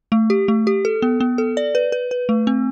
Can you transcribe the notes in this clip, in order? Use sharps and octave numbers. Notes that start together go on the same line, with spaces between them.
A3
G4
A3
G4
A4
B3
B3
A4
D5
B4
B4
B4
A3
C4